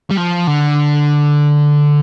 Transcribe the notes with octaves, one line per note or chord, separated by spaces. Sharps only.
G3
F3
D3